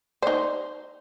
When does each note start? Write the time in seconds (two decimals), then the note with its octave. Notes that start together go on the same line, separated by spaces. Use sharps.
0.23 D#4 C5 D5